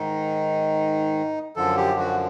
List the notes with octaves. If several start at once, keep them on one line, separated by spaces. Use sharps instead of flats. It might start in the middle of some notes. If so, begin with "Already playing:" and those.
Already playing: G#2 D#3 D#4
F#2 D3 F3 A4
G4
F#4